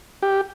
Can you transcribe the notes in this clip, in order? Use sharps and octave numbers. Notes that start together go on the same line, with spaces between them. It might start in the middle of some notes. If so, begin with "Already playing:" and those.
G4